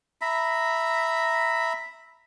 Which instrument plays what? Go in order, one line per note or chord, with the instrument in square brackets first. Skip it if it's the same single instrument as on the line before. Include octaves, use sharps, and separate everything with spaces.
[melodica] E5 A#5 B5